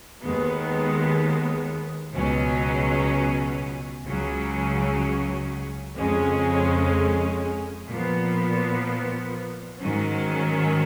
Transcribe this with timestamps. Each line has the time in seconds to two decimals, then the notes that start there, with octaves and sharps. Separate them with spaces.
0.22 D#2 D#3 G#3 B3
2.14 C#2 B2 F#3 C#4
4.05 C#2 C#3 F#3 C#4
5.96 F2 C#3 G#3 C#4
7.89 A#2 F3 B3
9.80 G#2 D#3 F#3 C#4